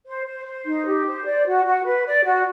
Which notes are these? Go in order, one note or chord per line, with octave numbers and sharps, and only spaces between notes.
C5
C5
C5
D#4
G4
C5
D5
F#4
F#4
B4
D5
F#4